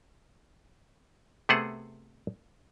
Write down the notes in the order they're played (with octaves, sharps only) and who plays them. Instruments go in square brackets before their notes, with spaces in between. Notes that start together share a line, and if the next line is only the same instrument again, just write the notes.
[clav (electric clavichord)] C3 A3 B3 G#4 C5 F#5